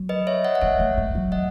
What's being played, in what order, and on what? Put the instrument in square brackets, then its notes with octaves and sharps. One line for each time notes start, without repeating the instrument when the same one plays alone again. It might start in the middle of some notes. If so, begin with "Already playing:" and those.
Already playing: [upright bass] F#3
[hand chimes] B4 D#5
C#5 E5
D#5 F#5
F#5
[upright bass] G#3 [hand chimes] C#5 E5
[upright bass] A3
G#3
F#3
[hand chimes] D#5 F#5